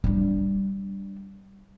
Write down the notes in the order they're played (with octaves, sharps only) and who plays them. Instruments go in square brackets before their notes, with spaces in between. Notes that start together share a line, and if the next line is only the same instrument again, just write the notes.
[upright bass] G3 D4